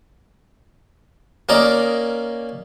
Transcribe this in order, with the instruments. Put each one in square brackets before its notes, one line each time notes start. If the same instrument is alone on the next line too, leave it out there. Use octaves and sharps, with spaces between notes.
[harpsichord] A#3 C#4 A#4 D5 D#5 A#5